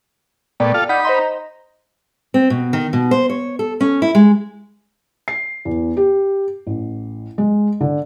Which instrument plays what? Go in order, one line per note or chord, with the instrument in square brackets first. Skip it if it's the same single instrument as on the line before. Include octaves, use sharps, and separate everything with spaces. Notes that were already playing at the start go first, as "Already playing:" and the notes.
[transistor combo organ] A#2 A3 B3 [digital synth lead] D5 [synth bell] G5
[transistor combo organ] F4 A4 F5
[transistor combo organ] D#4 B5 [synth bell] F#5 G6
[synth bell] C5 D#5 C6 [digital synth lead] A#5
[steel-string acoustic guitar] C4
B2
D#3
B2
C5
C#5
A4
C#4
E4
G#3
[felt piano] C7
E2
G4
A1
G#3
D3